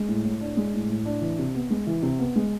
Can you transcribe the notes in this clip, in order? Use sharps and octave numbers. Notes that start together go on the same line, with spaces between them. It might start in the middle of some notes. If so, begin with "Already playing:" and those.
Already playing: G#3
A2
A2
D4
G#3
A2
A2
D4
E3
C3
B3
G#3
E3
C3
B3
G#3